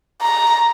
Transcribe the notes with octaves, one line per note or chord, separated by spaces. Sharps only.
A#5